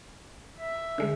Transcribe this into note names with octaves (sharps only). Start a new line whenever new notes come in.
E5
D3 G#3